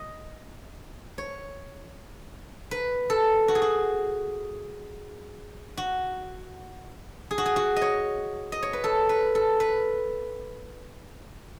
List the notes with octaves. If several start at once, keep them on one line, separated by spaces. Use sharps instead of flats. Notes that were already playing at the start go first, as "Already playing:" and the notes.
Already playing: D#5
C#5
B4
A4
F#4
G#4
F#4
F#4
G#4
F#4
G#4
F#4
D#5
C#5
D#5
C#5
B4
A4
B4
A4
B4